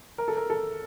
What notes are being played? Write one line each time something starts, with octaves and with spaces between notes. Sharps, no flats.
A#4
A4
A#4
A4